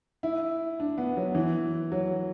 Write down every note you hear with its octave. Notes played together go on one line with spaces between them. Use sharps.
E4
D4
B3
F#3
E3
F#3